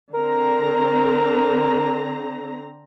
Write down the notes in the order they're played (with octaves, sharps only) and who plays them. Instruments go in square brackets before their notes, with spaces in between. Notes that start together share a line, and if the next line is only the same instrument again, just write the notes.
[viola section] D3 C4 A#5 [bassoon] A#4